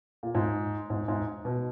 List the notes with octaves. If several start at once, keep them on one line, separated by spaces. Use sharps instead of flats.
A#2
G#2
G#2
G#2
B2